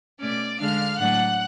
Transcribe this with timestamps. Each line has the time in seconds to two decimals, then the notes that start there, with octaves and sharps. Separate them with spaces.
0.19 B2 A3 C#4 D5 D6
0.59 D3 G#3 D4 F5 F6
0.98 A2 F#3 A3 D4 F#5 F#6